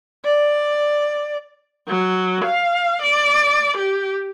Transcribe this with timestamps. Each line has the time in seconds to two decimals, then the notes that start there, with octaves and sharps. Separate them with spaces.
0.25 D5
1.88 F#3
2.45 F5
3.03 D5
3.77 G4